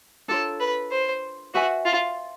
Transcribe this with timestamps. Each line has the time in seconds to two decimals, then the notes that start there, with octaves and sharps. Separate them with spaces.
0.28 D4 F4 A4 A#4 C#5
0.60 B4
0.92 C5
1.55 F#4 B4 E5 G#5
1.85 F4